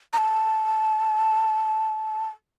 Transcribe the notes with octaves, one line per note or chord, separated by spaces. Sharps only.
A#5
A5